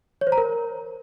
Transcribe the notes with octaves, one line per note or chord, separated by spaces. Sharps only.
C#5
C5
A#5
A#4